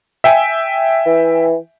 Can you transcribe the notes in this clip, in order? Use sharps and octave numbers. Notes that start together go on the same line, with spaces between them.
E5 G5 G#5
E3